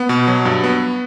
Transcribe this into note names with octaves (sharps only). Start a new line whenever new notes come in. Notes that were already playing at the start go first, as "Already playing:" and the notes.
Already playing: B3
B2
F#3
G2
B3